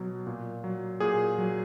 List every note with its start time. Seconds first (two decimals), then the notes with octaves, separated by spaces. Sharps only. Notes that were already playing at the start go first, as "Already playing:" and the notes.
Already playing: B2 F#3
0.27 A#2
0.64 F#3
1.00 A#2 G#4
1.38 F#3